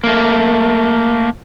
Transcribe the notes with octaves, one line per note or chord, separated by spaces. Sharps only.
A3 A#3